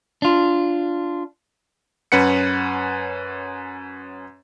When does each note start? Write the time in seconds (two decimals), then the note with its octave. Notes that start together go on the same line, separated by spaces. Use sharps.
0.22 D4 F4
2.12 F#2 C#4 B4 F#5 C#7